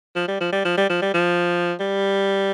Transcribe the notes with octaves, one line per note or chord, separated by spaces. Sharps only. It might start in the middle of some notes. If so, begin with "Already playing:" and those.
F3
G3
F3
G3
F3
G3
F3
G3
F3
G3